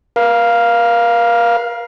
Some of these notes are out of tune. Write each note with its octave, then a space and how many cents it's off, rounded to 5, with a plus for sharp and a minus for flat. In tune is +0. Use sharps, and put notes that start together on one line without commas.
A#4 +40 F5 +0